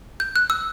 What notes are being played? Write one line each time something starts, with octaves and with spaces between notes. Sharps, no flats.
G6
F#6
E6